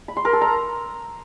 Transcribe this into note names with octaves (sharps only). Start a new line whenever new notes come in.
B5
C6
A#4
A4
A#5